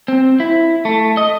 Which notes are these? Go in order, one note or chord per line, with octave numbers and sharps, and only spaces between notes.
C4
E4
A3
D#5